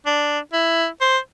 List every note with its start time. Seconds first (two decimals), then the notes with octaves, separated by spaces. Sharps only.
0.06 D4
0.53 E4
1.01 C5